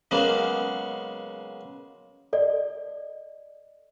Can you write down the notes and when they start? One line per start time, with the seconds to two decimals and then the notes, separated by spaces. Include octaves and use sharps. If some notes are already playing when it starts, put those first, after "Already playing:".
0.11 C#3 F#3 G#3 A#3 B3
2.33 A4 D5 D#5